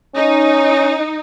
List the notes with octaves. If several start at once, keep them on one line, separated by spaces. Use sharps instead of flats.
C#4 D#4